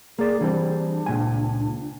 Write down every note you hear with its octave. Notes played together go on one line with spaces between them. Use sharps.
A#3 G#4 D5
E3 G3 C4 D4
C#2 A#2 G#5